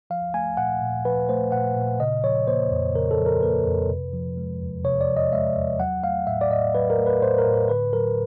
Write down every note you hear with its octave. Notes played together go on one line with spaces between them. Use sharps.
F3 F5
A3 G#5
A#2 F#5
A#2
F3 B4
A3 C5
A#2 F#5
A#2
C#3 D#5
F3 C#5
A#3 C5
F2
C#3 A#4
A4
F3
A#4
A#3 B4
F2
C3
F3
G#3
E2
C3 C#5
D5
F3
D#5
G#3 E5
E2
F#3 F#5
A3 F5
A2 E5
D5
A2 D#5
F#3 B4
A#4
A3
B4
A2 C5
A#4
A2
A#4
D3 B4
F#3 A#4